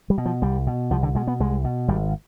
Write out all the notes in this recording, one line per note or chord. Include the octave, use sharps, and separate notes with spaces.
G3
B2
F3
C2 G3
B2
C2 F3
D3
B2 G#3
B3
C2 G#3
B2
G#1 G3